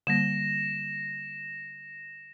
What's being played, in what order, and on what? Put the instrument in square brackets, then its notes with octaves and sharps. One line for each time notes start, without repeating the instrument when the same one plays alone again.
[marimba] D3 G3 A#3 [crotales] A#6 E7